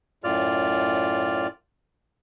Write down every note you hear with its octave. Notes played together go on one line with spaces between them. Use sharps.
F#2 A2 F4 D5 F6